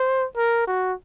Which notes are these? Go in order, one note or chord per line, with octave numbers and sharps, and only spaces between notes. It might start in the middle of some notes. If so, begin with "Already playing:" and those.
Already playing: C5
A#4
F#4